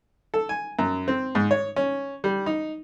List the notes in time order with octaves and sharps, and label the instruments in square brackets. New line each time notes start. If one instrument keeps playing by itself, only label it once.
[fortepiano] A4
G#5
F#2
C4
G#2
C#5
C#4
G3
D#4